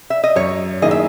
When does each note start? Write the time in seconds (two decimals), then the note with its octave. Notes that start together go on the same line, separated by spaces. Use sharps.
0.10 E5
0.24 D#5
0.36 F#2 C#5
0.82 D#3 A#3 E4 G#4 D#5
0.91 E5